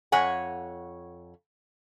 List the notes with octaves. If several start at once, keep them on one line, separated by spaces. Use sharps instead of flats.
F2 C#5 F#5 G#5